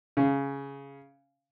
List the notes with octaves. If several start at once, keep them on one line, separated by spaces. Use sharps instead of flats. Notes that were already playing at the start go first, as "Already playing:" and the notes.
C#3